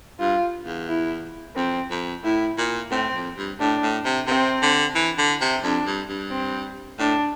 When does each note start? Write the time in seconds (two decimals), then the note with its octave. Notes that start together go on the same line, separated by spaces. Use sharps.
0.20 G2 F4
0.66 E2
0.88 E4
1.56 F2 C4
1.90 F2
2.24 A2 E4
2.58 A#2
2.91 A2 C4
3.14 F2
3.37 G2
3.59 A2 D4
3.83 A2
4.05 C3
4.27 C3 C4
4.62 D3
4.95 E3
5.18 D3
5.41 C3
5.63 F2 D4
5.86 G2
6.09 G2
6.31 C4
6.99 A2 D4